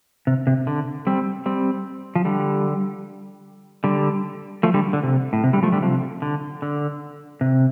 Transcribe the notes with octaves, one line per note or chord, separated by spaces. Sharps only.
C3
C3
D3
G3 C4
G3 C4
F3
D3 G3
D3 G3
F3 A3
D3 G3
D3
C3
A2
C3
D3 G3
F3 A3
D3 G3
C3 F3
D3
D3
C3